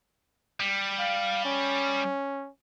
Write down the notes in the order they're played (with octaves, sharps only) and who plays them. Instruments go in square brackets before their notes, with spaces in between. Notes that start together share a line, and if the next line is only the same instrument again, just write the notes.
[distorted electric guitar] G3
[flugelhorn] F5
C#4